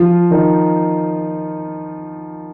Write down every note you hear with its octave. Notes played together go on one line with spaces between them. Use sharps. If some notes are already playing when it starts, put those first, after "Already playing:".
Already playing: F3 F4
D#3 D#4